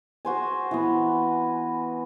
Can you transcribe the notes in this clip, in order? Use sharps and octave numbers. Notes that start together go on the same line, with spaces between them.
F#4 C5 G#5
E3 B3